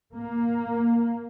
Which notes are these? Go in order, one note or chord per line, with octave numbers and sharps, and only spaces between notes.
A#3